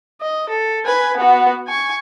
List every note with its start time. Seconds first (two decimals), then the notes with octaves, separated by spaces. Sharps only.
0.21 D#5
0.49 A4
0.86 B4 G#5
1.17 B3 F#4
1.68 G#5 C#6